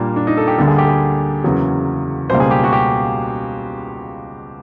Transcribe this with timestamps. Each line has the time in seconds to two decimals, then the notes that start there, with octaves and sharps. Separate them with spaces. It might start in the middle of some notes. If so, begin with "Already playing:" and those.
Already playing: A#2 G3 A#3 D4
0.16 D4
0.27 D#4
0.37 A4
0.47 G4
0.58 D2 D3 G3 A#3 A4
0.68 G#4
0.78 G4
0.88 G#4
1.44 E2 C#3 F#3 A#3
2.30 C#2 B2 G3 A#3 C5
2.40 G#4
2.51 G4
2.64 F#4
2.73 G4